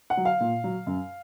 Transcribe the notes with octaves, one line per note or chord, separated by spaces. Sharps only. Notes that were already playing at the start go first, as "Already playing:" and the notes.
F#5
F#3
F5
A#2
F#3
F#2